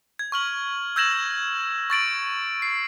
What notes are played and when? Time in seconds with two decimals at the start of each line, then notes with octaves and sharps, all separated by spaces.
0.19 G#6
0.32 C#6 F6 F#7
0.96 E6 G6 G#6 A#6 E7 F#7
1.90 C#6 A6 D7 F#7
2.62 C7